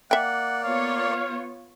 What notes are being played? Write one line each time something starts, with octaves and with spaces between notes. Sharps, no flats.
A#3 D5 E5 F#5 G5
B3 F4 C#5 F5